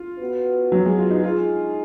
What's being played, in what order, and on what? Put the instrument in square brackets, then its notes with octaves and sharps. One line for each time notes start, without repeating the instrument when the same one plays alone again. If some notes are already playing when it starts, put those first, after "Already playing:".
Already playing: [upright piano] F4
[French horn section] B3 F#4 B4
[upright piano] F#3
G#3
F4
D#4
[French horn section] G#3 D#4 G#4 [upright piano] F4